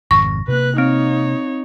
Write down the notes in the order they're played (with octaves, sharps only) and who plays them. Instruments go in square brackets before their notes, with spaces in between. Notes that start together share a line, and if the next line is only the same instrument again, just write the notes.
[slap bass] G#1 F2 C3 [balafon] C#6 [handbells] A#6
[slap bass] C3 A#3 [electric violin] B4 F#6
[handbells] C4 [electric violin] D#4 C#5